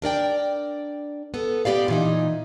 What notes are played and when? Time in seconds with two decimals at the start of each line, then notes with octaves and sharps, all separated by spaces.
0.02 D4 A#4 D5 G5
1.34 B3 A4
1.65 B3 G4 D5 F5
1.88 A#2 E3 D#4